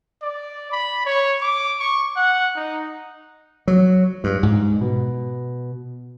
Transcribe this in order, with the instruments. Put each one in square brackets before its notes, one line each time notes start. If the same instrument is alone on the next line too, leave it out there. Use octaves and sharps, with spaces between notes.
[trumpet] D5
B5
C#5
D6
C#6
F#5
D#4
[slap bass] F#3
G2
G#2
B2